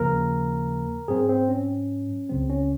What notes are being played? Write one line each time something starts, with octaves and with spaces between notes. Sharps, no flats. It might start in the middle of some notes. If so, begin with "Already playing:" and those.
Already playing: D#2 C#3 F3 A#3 A#4
G#2 F#3 C4 G#4
C4
C#4
C#2 C#3 F#3 C4
C#4